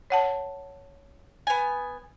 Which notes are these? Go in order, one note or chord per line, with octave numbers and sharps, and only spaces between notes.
C#5 F#5 A5
B3 G#5